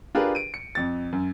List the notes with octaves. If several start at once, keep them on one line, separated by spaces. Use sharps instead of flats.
D4 F4 G4 G#4 A#4 B4
D7 D#7
C#7
F2 A6
F#2